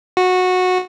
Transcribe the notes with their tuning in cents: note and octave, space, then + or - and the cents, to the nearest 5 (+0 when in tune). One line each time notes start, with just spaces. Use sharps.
F#4 -15